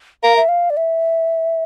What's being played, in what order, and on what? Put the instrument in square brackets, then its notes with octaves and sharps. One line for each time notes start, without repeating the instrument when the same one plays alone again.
[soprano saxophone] A#4 [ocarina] F5
[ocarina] E5
F5
D5
E5